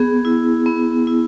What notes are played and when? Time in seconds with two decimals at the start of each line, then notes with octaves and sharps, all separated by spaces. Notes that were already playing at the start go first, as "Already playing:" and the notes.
Already playing: B3 G#4
0.25 E4
0.66 B3
1.07 E4